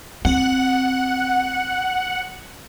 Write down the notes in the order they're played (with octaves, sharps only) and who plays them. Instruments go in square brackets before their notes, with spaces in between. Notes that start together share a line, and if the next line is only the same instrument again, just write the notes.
[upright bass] C4 [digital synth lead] F#5